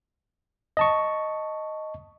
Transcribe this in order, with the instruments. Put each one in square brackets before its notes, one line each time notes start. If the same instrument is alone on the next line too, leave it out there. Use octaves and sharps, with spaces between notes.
[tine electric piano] D#5 A5 C#6